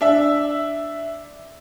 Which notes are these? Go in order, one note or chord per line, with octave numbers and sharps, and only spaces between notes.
D4 E5